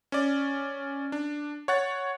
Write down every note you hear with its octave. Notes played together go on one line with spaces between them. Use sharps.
C#4 D5
D4
C#5 F#5 A6